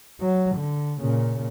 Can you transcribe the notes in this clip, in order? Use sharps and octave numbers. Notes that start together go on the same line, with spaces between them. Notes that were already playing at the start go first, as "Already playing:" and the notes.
F#3
D3
A#2 C#3